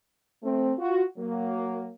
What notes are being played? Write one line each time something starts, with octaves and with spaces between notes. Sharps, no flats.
A3 C4
F4 F#4
F#3 A#3